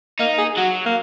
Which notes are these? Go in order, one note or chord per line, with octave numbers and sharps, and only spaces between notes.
A#3 D#4
G#4
F#3 F#4
A#3